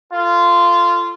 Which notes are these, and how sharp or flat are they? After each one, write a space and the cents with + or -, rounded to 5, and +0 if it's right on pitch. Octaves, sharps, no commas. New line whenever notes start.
F4 -15 A4 +15